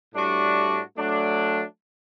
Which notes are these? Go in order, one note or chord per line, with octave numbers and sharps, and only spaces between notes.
A2 G3 D4 F#4
F#3 A3 D4